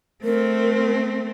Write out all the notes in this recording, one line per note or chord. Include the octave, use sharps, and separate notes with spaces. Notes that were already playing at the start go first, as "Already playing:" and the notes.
A3 C4 A#4